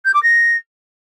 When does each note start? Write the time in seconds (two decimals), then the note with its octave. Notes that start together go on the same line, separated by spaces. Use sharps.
0.05 G6
0.14 D6
0.23 A#6